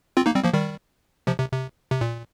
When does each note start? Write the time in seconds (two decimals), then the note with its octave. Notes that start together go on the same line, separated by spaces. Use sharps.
0.17 C4 F4
0.26 A#3 D#4
0.35 G3 C4
0.44 F3 A#3
0.53 D#3 G3
1.27 C3 F3
1.40 C3
1.52 C3
1.91 C3
2.01 A#2